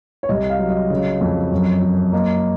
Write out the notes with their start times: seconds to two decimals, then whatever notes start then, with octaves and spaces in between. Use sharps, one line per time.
0.23 C#5
0.29 C2 D#5
0.50 F5
0.59 F#3
0.70 D#5
0.90 C#3
1.21 F2
1.51 F#2
1.83 F#2
2.12 A#3 D#5